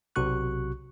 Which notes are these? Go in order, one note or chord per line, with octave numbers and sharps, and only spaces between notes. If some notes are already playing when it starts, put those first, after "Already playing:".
B1 C3 F#4 C#6 F#6